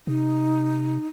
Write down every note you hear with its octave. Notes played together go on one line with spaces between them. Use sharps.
C3 D#4